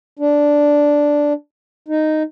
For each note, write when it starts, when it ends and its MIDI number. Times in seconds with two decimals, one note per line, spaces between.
0.19 1.33 62
1.88 2.23 63